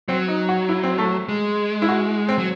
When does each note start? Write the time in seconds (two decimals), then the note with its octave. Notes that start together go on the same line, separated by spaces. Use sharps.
0.08 F#3 C4
0.28 D#4
0.49 F#4
0.69 E4
0.84 C4
0.98 A3
1.29 G#3
1.82 E4
1.88 F#4
2.29 C4
2.38 F#3